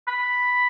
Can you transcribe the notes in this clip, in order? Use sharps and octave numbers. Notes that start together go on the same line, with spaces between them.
B5